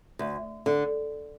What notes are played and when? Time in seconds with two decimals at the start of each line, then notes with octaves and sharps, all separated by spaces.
0.19 D2
0.66 D3